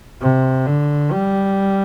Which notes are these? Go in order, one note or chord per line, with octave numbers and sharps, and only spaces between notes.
C3
D3
G3